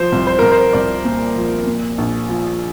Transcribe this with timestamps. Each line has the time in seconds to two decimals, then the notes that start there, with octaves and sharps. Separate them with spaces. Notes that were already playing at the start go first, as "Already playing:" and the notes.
Already playing: F3 C5
0.12 C2
0.27 C5
0.39 C2 A#4
0.52 C5
0.73 C2 D5
1.05 A#2
1.36 F3
1.66 A#2
1.98 A#1
2.29 F3